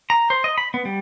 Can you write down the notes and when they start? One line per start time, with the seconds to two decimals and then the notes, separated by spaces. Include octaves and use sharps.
0.10 A#5
0.30 C5
0.44 D#5
0.58 B5
0.74 B3
0.85 G3